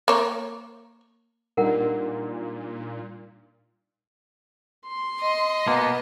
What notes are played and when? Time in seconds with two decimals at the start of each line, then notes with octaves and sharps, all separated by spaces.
0.08 A#3 C#5
1.57 A#2 G3 D4 D#4 A#4 F#5
4.88 C6
5.21 D#5
5.67 B2 A#3 B3